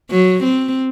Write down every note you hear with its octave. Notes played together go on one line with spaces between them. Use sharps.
F#3
C4